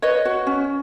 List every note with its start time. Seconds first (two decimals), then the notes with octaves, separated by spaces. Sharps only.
0.02 B4 C#5 D#5
0.25 F#4
0.47 C#4